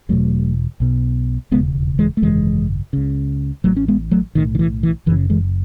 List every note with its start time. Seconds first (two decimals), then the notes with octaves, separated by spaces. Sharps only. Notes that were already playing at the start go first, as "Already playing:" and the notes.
0.09 E1 E2 B2 F#3 A3
0.80 B1 B2
1.51 E1 D#2 C#3 G#3 B3
1.99 E3 G#3
2.17 A3
2.22 G#1 F#2 C#3 E3 G#3
2.93 C#2 C#3
3.64 A1 A2 F#3 A3
3.76 C#4
3.88 G#3 B3
4.11 F#3 A3
4.35 B1 A2 D#3
4.55 D#3
4.59 E3
4.83 E3
5.06 F#1 F#2 C#3 E3
5.30 E3 G#3